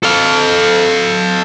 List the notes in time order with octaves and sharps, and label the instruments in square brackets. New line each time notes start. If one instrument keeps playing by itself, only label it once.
[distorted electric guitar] A4 F5